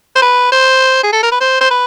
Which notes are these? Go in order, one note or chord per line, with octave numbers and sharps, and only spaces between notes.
C5
B4
C5
G#4
A4
A#4
B4
C5
C5
B4